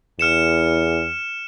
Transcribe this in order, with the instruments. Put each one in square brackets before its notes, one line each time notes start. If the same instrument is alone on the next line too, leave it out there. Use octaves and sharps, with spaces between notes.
[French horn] E2 [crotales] F6 C#7 E7